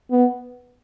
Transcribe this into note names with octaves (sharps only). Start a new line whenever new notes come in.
B3